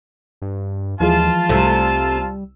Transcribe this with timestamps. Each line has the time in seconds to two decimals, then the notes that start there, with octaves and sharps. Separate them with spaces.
0.42 G2
1.00 D#2 E3 F3 G#3 F4 A5
1.49 C2 C3 G3 A3 E6